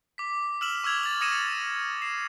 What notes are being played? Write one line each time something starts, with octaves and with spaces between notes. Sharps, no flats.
D6 B6
E6 F6 E7 F#7
C#6 E6 F6 G#6 F7
A6 F#7
D#6 A#6 C#7 D#7 E7
C7 E7